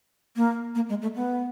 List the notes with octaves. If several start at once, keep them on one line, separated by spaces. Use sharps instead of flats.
A#3
A#3
G#3
A3
B3